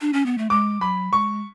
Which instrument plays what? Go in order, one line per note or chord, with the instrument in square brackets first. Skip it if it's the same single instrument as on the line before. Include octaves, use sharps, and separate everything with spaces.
[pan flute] D4
C#4
B3
A3
[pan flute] G#3 [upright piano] D6
[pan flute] F#3 [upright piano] B5
[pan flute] G#3 [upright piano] C#6